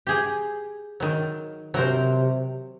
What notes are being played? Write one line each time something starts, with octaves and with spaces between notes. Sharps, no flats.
G4 G#4
D#3 F#3
C3 F#3 A#4 C5